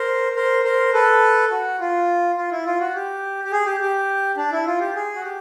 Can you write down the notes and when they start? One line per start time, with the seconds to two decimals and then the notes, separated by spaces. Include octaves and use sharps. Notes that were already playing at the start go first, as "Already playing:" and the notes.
Already playing: A#4 C5
0.36 A#4 C5
0.64 A#4 C5
0.93 A4 B4
1.51 F#4
1.80 F4
2.37 F4
2.51 E4
2.66 F4
2.80 F#4
2.95 G4
3.44 G4
3.52 G#4
3.65 G4
3.81 G4
4.37 D4
4.52 E4
4.66 F4
4.80 G4
4.95 G#4
5.15 F#4
5.23 G4